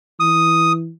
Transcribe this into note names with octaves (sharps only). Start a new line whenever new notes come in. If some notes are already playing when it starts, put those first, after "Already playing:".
E3 D#6